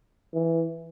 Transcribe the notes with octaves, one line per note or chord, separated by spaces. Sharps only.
E3